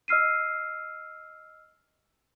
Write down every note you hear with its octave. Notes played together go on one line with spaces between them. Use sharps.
D#5 E6 F6 C7 D#7